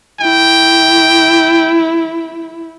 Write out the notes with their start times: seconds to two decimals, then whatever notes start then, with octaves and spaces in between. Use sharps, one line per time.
0.20 E4 G5